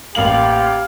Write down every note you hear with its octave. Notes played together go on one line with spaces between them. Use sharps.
A1 A#3 G4 F5 F#7